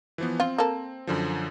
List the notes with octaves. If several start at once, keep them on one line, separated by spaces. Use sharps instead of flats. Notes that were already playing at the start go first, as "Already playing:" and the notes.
E3 F3 B3
C4 F4
A#3 A4
F#2 D3 F3